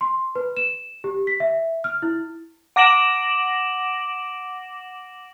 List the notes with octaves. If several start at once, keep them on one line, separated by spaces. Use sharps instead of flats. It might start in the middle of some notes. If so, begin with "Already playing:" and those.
C6
B4
E7
G4
B6
E5
F6
E4
F#5 D6 A#6 D7 E7 F#7